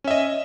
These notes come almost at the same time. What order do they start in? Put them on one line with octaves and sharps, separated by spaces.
C#4 E5 D#5